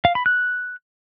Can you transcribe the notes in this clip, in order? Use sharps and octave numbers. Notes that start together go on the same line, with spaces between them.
F5
B5
F#6